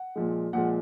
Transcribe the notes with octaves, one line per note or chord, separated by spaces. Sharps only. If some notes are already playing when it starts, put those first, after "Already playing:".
Already playing: F#5
A#2 F3 G#3
A#2 F3 G#3 F#5